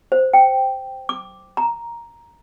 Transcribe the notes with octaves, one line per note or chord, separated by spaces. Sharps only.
C5
G5
D6
A#5